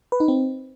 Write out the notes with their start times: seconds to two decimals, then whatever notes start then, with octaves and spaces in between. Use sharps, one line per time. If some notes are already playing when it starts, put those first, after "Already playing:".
0.12 B4
0.20 D#4
0.28 C4